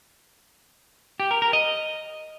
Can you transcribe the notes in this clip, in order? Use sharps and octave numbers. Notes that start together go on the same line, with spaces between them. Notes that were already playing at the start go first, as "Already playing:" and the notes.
G4
A#4
A#4
D#5